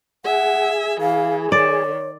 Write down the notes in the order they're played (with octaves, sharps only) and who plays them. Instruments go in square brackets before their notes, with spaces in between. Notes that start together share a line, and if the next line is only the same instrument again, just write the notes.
[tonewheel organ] G#4 [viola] E5 [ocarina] F#5
[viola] E3 [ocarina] F5
[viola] D#3 [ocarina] C#5 [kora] D5